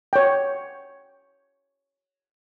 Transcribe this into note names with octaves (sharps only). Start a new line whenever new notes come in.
C#5 G5